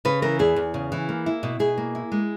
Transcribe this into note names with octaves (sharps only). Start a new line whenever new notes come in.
C#3 B4
E3 A#4
E2 G#4
E2
C#3
E3
A#3
E4
B2
B2 G#4
A#3
E4
G#3